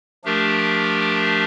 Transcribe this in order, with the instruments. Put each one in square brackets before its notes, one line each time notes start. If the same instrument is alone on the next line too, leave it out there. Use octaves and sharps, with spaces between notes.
[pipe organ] F3 A3 D4 G4 A#4